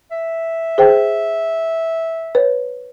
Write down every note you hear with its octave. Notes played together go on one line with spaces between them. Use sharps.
E5
G#4 C5 G5
B4 C#5